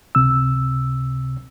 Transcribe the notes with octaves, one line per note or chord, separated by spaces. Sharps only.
C#2 C3 E6